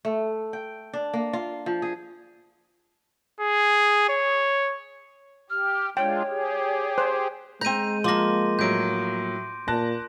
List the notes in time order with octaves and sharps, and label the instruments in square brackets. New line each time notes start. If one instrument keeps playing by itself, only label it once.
[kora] A3
G5
D4
A#3
F4
F3
G#4
[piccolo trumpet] G#4
C#5
[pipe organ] G4 [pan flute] F6
[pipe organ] G#3 D4 F4 [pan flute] C#5 [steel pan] G5
[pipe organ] G4 G#4
[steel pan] C5
[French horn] G#3 [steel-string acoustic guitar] C4 A#5 [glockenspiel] G6 D#7
[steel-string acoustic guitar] F3 A#3 [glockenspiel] C6 D6 A#6
[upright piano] A2 F#3 [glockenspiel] G6 D7
[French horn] A#2 [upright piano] A5 F#6 A#6